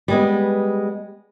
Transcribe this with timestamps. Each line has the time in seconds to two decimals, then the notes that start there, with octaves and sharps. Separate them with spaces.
0.08 G3 G#3 B3